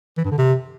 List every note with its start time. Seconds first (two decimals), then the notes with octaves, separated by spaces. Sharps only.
0.17 E3
0.24 G2
0.31 D3
0.38 C3